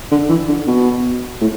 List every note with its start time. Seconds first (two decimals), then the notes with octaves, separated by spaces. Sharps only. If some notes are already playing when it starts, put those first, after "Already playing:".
0.11 D3
0.29 E3
0.48 D3
0.67 B2
1.41 A2